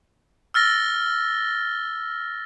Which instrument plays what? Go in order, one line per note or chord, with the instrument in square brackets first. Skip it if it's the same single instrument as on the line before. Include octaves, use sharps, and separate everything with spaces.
[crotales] E6 F6 A6 A#6 G7